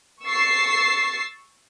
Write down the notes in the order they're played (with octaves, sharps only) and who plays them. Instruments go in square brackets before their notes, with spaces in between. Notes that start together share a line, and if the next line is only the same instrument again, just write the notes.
[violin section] C#6 E6 A6 C7